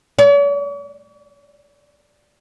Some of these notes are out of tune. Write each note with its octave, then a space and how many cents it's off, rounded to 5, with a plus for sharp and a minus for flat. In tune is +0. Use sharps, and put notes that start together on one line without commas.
C#5 +45